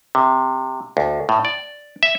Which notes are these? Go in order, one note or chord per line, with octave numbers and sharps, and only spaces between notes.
C3
D2
A2
D5
E5